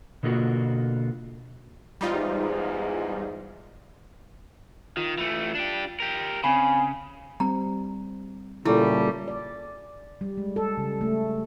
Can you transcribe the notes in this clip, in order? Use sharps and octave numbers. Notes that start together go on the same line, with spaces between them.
B2 D3 A#3 F4 F#4
E2 G#2 G3 D#4 F4
D#3 F4
E3 A3
D4 G4
G4 A#4
C#3 C4 G#5 B5
G3 C4 A#5
A#2 C#3 G3 A3 E4
D5
G3
G#3
A4
C#3
A3